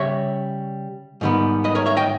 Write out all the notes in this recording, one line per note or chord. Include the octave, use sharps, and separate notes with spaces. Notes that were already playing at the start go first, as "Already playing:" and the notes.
Already playing: C#3 G3 C#5 E5
G#2 D#3 G3 B3
B4 D#5
A#4 C#5
C#5 E5
D#5 G5